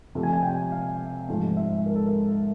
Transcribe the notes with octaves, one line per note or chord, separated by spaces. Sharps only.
C3 F3 A3
G#5
G#5
G5
F5
G#2 F3 A3
E5
A#4
A4
A#4